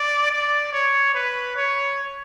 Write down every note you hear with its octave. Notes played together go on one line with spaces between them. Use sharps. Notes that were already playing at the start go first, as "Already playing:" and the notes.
Already playing: D5
D5
C#5
B4
C#5